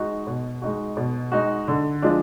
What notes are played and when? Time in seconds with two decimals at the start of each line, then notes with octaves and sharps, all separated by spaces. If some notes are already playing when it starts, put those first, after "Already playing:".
Already playing: G#3 D#4 F#4
0.27 B2
0.62 G#3 D#4 F#4
0.97 B2
1.32 G#3 D#4 F#4
1.68 D3
2.02 F3 G#3 D4